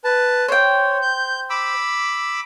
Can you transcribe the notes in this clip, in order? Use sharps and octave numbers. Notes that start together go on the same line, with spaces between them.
B4 A5
C5 C#5 G5
G6
B5 D6 E6